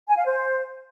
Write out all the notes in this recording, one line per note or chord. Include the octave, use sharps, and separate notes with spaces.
G#5
F5
C5